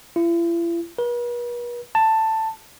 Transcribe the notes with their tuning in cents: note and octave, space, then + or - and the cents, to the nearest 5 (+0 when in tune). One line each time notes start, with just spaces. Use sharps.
E4 +45
B4 -45
A5 +10